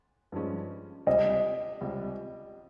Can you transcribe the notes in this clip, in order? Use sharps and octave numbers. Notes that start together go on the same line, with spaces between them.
G2 F3 G#3 C#4
C#2 C3 G3 D#5
C#2 C3 G3